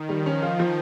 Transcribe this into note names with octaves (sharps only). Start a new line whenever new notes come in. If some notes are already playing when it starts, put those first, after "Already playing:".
Already playing: D#3
F3 G3
C#4
F4
F3